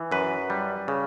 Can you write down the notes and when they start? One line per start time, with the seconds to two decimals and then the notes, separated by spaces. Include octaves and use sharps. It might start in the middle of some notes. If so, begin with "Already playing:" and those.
Already playing: E3
0.12 F#2 B4
0.50 G3
0.88 C#3